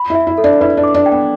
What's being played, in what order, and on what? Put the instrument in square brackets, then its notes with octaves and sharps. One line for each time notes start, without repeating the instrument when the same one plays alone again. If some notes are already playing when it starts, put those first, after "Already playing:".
Already playing: [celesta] B5
[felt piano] E4
[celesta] E5
[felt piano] E4
[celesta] A4
[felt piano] D4
[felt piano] E4 [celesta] B4
[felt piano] D4
[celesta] D6
[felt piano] D4
[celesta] G5
[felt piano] B3